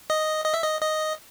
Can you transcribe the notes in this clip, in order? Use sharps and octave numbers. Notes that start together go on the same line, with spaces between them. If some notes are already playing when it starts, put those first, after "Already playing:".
D#5
D#5
E5
D#5
D#5